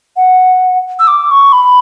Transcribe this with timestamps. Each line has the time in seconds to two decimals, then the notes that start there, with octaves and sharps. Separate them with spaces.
0.17 F#5
0.99 E6
1.07 D6
1.31 C#6
1.53 B5